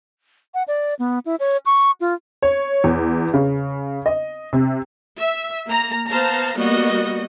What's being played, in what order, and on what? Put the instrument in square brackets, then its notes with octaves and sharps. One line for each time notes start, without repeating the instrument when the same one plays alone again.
[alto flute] F#5
D5
B3
E4
C#5
C#6
F4
[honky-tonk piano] C#5
E2
C#3
D#5
C3
[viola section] E5
A#3 A#5
B3 C5 F5 A5 A#5
G3 A#3 B3 F#4 D#5